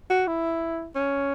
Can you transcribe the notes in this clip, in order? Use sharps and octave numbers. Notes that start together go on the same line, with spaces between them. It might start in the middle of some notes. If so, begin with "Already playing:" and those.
F#4
E4
C#4